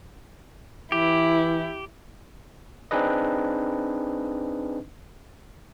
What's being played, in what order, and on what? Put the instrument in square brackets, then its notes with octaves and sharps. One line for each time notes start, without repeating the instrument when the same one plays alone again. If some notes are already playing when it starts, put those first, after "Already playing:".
[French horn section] E3 [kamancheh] E4 [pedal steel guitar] G4
[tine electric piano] C4 D4 D#4 G#4 B4 D#5